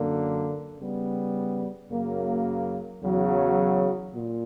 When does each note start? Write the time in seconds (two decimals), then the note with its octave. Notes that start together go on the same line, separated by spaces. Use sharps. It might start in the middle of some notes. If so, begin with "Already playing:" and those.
Already playing: F#2 D3 A#3
0.77 C#3 G3 B3
1.90 F#2 C#3 F#3 A#3
3.02 E2 C#3 F#3
4.15 A#2